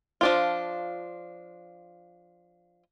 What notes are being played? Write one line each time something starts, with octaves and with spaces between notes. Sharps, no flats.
F3 D4 F4